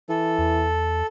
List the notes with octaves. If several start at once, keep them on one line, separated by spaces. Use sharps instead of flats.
E3 A4
E2